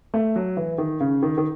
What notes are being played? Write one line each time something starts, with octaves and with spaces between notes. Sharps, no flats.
A3
F#3
E3
D#3
C#3
D#3
D#3